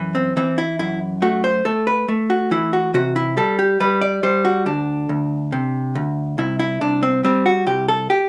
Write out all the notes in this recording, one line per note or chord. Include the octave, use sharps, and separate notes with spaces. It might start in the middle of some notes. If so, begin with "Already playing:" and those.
Already playing: F#2 E3
C4
E3 C4
E4
F#2 E4
A3 F#4
C5
A3 A4
B4
A3
F#4
E3 E4
F#4
C3 F#4
E4
G3 A4
G4
G3 B4
D5
G3 C5
F#4
D2 D4
D2
C3
D2
C2 E4
E4
C2 D4
C4
G3 C4
F#4
C2 G4
A4
G4